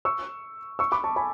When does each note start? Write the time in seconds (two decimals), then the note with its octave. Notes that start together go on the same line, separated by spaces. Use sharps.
0.05 C#6 E6
0.79 C#6 E6
0.92 B5 D6
1.04 A5 C#6
1.16 G#5 B5